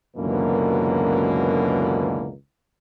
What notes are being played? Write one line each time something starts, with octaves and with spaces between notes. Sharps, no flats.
C#2 F#2 B2 D3 E3 A#3